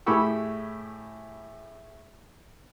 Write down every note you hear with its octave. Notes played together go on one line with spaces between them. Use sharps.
A2 G4 G#4 B5 C#6 E6